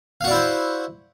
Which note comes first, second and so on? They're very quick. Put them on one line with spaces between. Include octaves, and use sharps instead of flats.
F5 F#4 D5 E4 C5